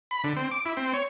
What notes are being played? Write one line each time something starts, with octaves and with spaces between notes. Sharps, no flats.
B5
D3
C4
D6
E4
C4
C#5